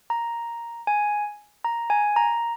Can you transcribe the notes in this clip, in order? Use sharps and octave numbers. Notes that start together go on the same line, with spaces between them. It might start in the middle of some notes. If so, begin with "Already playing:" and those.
A#5
G#5
A#5
G#5
A#5